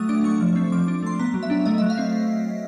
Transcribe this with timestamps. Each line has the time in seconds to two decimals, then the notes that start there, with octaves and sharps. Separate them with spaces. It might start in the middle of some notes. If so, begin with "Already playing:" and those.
Already playing: F#3 A3 D#6
0.09 D4 D6
0.24 A3 C#6
0.40 F3
0.56 C4
0.72 F3 D6
0.84 D4 D6
1.03 A3 C6
1.19 B3 A#5
1.34 F#3
1.43 E5
1.50 D4
1.65 A3 D#5
1.78 F#3 E5
1.90 F5
1.98 C4